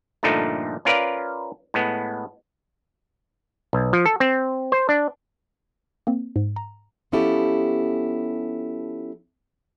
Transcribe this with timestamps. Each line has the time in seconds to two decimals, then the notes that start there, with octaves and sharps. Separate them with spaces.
0.23 G2 A#2 D3 F3 A3 D#4
0.85 C#4 F4 A#4 B4 D5 F5
1.74 A2 G#3 B3
3.73 B1
3.93 F3
4.06 A4
4.20 C4
4.72 C5
4.89 D4
6.07 A#3 C4
6.36 G#2
6.56 A#5
7.12 F3 B3 C#4 E4 G4 A4